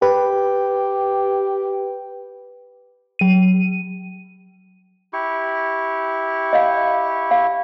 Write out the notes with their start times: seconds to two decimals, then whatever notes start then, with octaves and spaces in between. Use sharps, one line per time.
0.02 G4 B4
3.19 F#3 D#7
5.13 E4 G4 C#6
6.53 D#5 F5
7.31 F5